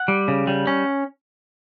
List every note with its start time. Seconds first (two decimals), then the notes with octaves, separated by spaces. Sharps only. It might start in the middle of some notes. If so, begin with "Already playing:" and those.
Already playing: F#5
0.08 G3
0.28 C#3
0.47 G3
0.67 C#4